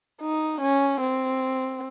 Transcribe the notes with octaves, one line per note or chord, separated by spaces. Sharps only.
D#4
C#4
C4